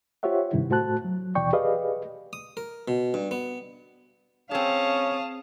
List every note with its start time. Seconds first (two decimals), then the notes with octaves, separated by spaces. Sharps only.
0.23 F4 G4 C5 C#5 E5 F#5
0.53 G2 C3 D#3 E4
0.69 A2 A3 F#4 C5 A5 F#6
1.05 F#3
1.35 D#2 B2 E3 D5 G5 C#6
1.53 G4 G#4 B4 D5 D#5 F5
2.33 D#6
2.57 A#4
2.88 B2
3.14 G2
3.31 B3
4.51 C4 C#4 G#4 F5 A5 D#6